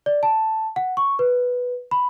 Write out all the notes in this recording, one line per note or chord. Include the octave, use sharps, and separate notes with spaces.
D5
A5
F#5
C#6
B4
B5